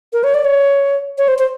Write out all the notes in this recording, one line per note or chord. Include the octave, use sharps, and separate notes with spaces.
A#4
C#5
D5
C#5
C#5
C5
C5